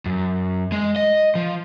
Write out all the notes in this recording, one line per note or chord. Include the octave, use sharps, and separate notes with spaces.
F#2
G#3
D#5
F3